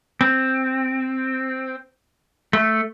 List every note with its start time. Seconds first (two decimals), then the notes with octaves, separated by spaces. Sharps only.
0.21 C4
2.53 A3